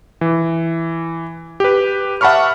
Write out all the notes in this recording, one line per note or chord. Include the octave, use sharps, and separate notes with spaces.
E3
G4 B4
E5 F#5 A5 B5 C#6 F6